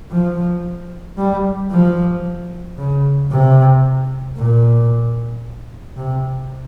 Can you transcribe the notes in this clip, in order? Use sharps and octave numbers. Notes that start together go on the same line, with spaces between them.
F3
G3
F3
C#3
C3
A#2
C3